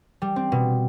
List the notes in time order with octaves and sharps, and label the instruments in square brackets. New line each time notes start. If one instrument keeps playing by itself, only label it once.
[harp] G3
C4
B2